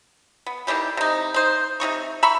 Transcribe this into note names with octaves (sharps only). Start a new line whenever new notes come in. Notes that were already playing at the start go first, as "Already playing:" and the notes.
B3
D#3 E3 G3 G4
C3 D#4
D#4 C5
C3 G3 D#4 C#6
E5 A#5 B5 C#6